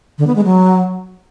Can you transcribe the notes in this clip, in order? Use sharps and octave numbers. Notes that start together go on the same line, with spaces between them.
D3
B3
G#3
F#3